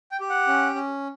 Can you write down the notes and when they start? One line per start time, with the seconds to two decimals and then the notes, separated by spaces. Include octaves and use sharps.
0.12 G5
0.20 G4
0.30 F#5
0.47 C#4
0.75 C#4